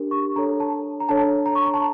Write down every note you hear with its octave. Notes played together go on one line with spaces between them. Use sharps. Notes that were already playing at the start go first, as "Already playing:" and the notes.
Already playing: D4 G4 A#4
C#6
D4 A4 C#5 A#5
A5
A#5
D4 A4 C#5 A5
A#5
C#6
A#5
A5